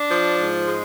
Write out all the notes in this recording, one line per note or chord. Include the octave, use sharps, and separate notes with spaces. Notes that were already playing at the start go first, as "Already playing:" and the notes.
Already playing: D4
F3
G#2
G#3